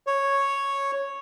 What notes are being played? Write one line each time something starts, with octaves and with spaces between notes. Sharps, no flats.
C#5